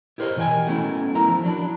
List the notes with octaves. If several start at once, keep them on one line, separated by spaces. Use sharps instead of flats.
E4 G4 A#4 C5 C#5 D#5
B2 E3 D#5 G5 G#5
F#3 A3 B3 C#4 E4
F#3 E4 A#4 A#5
F3
F#3 D4 E4